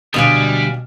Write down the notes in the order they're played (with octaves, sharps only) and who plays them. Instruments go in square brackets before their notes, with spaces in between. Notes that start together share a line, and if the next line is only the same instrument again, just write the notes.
[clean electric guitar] D2 D4 [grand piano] B2 E7 [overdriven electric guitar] G3 [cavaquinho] D#5 F5 G#5